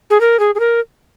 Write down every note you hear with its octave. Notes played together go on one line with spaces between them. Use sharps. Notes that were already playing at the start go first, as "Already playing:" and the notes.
G#4
A#4
G#4
G#4
A#4